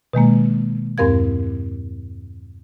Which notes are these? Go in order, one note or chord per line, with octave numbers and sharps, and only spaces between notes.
B2 D#3 G#3 A#3
E2 G2 C4 A#4 F5 G#6